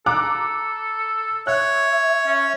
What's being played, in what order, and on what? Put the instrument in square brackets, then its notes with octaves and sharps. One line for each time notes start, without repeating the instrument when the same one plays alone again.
[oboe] A4 [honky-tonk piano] A#5 D6 F#6
[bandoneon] C#5 [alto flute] E5 [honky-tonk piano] F#6
[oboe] C#4